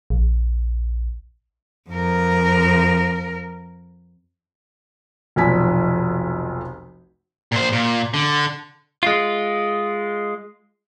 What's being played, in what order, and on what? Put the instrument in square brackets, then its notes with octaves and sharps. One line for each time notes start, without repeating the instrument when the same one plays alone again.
[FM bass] A#1
[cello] F2 A#4
[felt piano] F1 B1 F3 G#5 B6
[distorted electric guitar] A#2 C5
A#2
D3
[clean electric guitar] G#3 F4